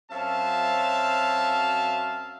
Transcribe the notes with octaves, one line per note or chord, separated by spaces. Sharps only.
F#2 F#3 C4 E5 F5 A5